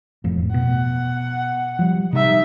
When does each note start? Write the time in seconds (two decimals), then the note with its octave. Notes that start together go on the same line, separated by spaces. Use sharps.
0.24 E1 F2 A2
0.54 B2 F#5
1.79 F3 G3
2.13 C3 G3 D#4 E5